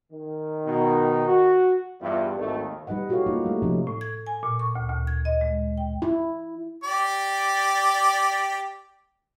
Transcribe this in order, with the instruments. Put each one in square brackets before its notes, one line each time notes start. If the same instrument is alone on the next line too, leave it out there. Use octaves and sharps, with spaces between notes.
[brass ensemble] D#3
[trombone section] B2 D#4
F#4
[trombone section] E2 G2 G3 [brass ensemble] F4 B4 E5
[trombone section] G#1 A3 [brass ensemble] D#2 D#3
[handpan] G3 D#4 B4 D#5 F#5
E4 F#4 G4 A4 C#5 F5
A#3 D#4 F4
G3 A3
C3 F3 A3 C#4 D#4
[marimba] A2
G#6
G#5
A#2
C#6
D2
D2
G#6
D#5
G#3
G5
[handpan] E4
[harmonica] G4 D5